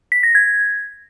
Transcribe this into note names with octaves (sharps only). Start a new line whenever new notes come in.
B6
A#6
G#6